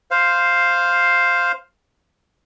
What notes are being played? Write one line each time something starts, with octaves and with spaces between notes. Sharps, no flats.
C5 F5